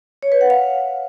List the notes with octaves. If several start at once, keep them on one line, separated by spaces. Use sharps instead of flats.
C#5
B4
F#5
F5